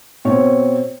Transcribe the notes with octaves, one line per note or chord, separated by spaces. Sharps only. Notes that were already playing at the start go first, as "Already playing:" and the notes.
B2 C4 C#5